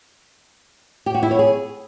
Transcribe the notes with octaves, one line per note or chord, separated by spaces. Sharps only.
G4
F#4
E4
C#5
G#4